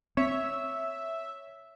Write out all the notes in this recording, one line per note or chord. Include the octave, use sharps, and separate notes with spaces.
C4 C#5 E5